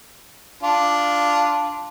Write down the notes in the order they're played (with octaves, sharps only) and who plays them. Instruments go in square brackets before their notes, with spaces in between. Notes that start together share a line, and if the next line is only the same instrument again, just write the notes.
[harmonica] D4 F4